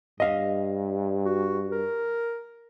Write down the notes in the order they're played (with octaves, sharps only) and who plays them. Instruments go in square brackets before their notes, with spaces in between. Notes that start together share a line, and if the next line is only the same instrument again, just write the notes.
[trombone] G2 [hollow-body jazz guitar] D#5 F5
[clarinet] F#4
A#4